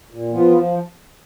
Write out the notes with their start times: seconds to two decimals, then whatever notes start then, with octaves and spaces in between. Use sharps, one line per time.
0.10 A#2
0.32 F3 B3 F4
0.53 F3